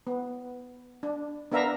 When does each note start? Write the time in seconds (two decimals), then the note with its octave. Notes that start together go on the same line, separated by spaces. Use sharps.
0.07 B3
1.03 D4
1.52 B3 D4 A#4 E5 F5 A#5